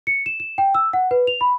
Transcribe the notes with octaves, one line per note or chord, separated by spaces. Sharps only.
C#7
E7
E7
G5
E6
F#5
B4
F7
B5